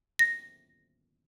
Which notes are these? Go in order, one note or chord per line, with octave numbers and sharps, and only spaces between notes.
A#6